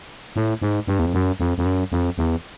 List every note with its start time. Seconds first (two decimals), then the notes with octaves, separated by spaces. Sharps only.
0.36 A2
0.62 G#2
0.87 G2
0.99 E2
1.06 F2
1.14 F#2
1.40 F2
1.58 F2
1.66 F#2
1.92 F2
2.18 E2